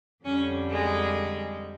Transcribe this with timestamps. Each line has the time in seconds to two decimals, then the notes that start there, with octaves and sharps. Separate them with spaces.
0.24 F2 D3 G3 C#4
0.70 G#3